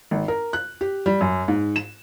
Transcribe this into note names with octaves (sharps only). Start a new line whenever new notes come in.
G#1
A#4
F#6
G4
G3
F#2
G#2
E7